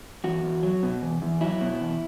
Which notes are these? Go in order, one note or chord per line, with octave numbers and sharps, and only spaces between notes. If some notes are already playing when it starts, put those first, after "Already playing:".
E2 F#4
E2
F#3
B2
E2
E2
F#3 E4
B2
E2